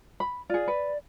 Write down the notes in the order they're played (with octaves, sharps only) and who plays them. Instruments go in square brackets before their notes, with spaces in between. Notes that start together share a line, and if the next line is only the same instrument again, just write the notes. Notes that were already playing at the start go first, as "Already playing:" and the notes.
[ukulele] B5
[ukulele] F4 G#4 [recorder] D5
[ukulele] B4